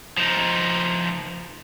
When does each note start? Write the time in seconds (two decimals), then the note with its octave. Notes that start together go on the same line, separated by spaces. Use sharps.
0.17 F3 D#4